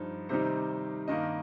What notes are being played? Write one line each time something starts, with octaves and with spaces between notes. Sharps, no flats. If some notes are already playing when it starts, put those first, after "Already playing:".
Already playing: G2 F3 D#4
C3 D#3 G3 D#4 C5
G2 D#3 A#3 D#5